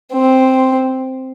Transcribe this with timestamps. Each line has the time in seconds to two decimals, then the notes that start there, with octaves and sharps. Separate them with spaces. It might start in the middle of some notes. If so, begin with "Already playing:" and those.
0.13 C4